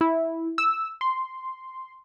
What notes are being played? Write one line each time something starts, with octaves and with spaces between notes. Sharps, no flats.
E4
E6
C6